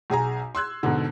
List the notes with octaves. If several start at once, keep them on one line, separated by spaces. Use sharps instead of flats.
B1 G#4 G#5 A#5
C6 E6 F#6 G#6
G#2 B2 D3